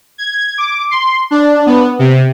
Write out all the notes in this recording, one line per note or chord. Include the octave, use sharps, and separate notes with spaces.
G#6
D6
C6
D4
B3
C3